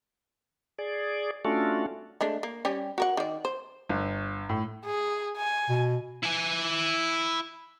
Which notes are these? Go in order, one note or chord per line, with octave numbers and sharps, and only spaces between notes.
G#4 D5
A3 C#4 D4 F4 F#4 A4
G#3 A3 D4
A#3
G3 C#4 G4
F#4 A#4 F#5
D#3 D5
C5
G1
A2
G#4
G#5
B2
E4 G#5